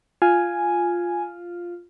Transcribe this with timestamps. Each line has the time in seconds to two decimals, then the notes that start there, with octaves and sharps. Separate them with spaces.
0.22 F4 G#5